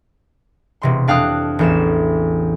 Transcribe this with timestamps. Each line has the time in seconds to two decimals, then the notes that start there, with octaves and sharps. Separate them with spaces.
0.82 E1 C3 C6
1.08 F2 D4 F5 G5 D#6 F#6
1.59 A1 E2 E7